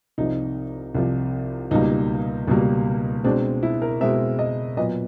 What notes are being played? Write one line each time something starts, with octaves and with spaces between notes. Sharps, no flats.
C2 C3 F3 D#4
C2 C3 F3
C#2 B2 G3 A#3 D#4
C#2 B2 G3 A#3
B2 G#3 C4 D4
E4
A#4
B2 G#3 C4 E5
D#5
A#2 F#3 B3 D#5